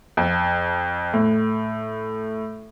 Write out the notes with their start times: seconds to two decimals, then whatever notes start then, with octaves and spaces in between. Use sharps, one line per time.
0.17 F2
1.14 A2